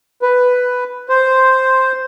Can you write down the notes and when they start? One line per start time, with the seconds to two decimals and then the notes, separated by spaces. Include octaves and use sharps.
0.22 B4
1.09 C5